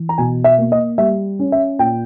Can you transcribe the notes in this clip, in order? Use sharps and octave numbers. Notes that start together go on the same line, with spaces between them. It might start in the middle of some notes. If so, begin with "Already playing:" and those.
Already playing: E3
A#5
B2 G#5
E5
A#3
D#5
G3 E5
C#4
E5
A#2 G5